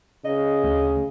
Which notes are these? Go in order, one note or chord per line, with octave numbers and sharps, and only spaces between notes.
C#3 D#5
D2